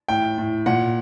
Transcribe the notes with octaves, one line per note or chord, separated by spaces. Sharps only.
A2 G5
A2
A#2 F#5